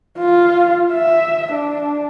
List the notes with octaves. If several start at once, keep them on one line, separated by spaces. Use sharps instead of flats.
F4
E5
D4